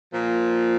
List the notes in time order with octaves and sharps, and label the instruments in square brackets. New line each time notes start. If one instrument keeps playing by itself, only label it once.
[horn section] A#2 F3